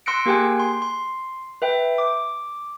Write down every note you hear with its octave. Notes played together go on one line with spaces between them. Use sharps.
C6 E6 F#6 A#6 C#7 D7
A#3 G4 G#4 G5 G#5 F#6
C6
C6
B4 E5 G5
D6